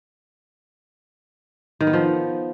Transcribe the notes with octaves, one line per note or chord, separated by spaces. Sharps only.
D#3
B3
F3